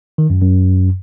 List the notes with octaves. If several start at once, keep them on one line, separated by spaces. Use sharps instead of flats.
D#3
F#2
F#2